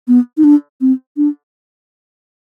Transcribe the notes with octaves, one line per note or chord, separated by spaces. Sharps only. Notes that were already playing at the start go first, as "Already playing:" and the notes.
B3
D#4
D4
C4
D4